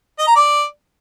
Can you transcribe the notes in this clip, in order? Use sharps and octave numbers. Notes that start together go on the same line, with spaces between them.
D#5
A#5
D5